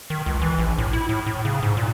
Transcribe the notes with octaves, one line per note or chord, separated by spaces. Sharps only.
D#3
C#2
E3
A#1
A2
E4
A2
A2
C#3
G#2
A#2